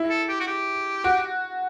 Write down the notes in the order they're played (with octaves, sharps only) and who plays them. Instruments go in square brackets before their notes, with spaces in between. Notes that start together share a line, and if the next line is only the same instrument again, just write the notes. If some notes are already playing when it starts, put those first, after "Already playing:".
Already playing: [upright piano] E4
[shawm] A4
G4
F#4
G4
[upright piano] F#4